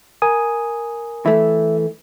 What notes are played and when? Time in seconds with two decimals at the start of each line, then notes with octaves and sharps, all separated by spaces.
0.22 A#4 G#5 D#6
1.26 E3 A3 E5